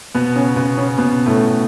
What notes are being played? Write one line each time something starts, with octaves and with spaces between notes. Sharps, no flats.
B2 B3
C#3 C#4
B2 B3
C#3 C#4
B2 B3
A2 A3